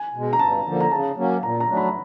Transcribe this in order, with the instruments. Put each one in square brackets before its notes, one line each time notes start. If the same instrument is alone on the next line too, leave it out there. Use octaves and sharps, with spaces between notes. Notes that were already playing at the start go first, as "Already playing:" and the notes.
Already playing: [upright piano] G#5
[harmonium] B2 G#3
[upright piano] A#5
[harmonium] G2 [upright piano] A5
[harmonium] D3 F3 A#3
[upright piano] A#5
[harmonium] C#3 [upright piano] A5
[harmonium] F#3 A#3 C#4
[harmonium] A#2 [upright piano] A#5
[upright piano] A#5
[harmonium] F#3 A3 D4
[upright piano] B5